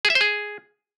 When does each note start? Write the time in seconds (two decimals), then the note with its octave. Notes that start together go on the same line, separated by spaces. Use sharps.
0.05 G#4
0.10 E5
0.15 C5
0.21 G#4